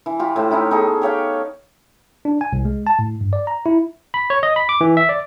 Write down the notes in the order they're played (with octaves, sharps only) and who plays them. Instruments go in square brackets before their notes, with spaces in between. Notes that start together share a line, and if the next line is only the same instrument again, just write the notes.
[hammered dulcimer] E3
F4 G4
A2 C5
C#4 D#4 E4 G4
B3 D#4 G#4 A4
G4 C#5 F5 G5
[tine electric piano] D4
G#5
C2
G#3
A5
A2
G2
D5
A#5
E4
B5
C#5
D#5
B5
D6
E3
E5
D5